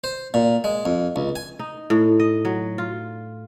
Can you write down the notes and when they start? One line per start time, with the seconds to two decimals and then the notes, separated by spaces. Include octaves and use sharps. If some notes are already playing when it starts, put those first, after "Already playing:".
0.04 C5
0.34 A#2
0.64 G#3
0.85 F2
1.16 C#2
1.36 G#5
1.59 D#4
1.90 A2
2.20 D#5
2.45 F#3
2.78 F4